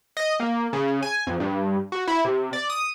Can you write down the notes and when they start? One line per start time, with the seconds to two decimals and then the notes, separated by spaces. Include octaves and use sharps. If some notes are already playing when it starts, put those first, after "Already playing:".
0.17 D#5
0.40 A#3
0.73 C#3
1.02 G#5
1.27 F2
1.40 G2
1.92 F#4
2.07 E4
2.25 C3
2.53 D5
2.70 D#6